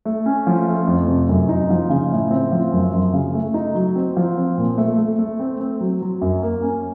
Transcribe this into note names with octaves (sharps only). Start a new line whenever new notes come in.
A3
C#4
F3
A3
F2
C3
F#2
D#4
F3
C#3
A2
C4
F3
F#2
F#2
C#3
A3
D#4
F#3
C4
F3
C4
A#2
A3
A3
A3
C4
C4
F#3
F#3
F#2
A#3
C#4